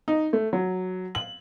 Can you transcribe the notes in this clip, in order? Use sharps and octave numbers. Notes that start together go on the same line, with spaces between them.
D#4
A3
F#3
F#7